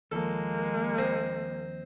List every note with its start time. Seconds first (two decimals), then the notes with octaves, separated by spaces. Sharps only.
0.12 D#2 F3 G#3 A#3 A4
0.98 C4 D#5